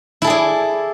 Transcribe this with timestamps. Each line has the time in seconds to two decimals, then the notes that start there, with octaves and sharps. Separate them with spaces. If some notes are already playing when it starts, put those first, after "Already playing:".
0.22 E4
0.24 A4
0.27 G#4
0.30 D5